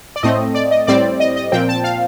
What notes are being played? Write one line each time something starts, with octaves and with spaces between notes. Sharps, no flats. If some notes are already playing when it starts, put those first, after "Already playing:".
D5
A2 A3 C4 D#5
D5
D#5
A2 G3 C4 D5
D#5
D#5
A#2 F3 C4 G5
A5
F5